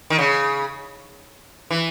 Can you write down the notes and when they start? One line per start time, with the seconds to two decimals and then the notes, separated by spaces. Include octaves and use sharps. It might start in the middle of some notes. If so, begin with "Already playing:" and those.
0.10 D#3
0.19 C#3
1.71 E3